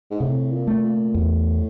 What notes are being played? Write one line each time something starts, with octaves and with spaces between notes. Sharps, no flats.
G#2
A2 C3
A#2
A3
A#2
E2 A2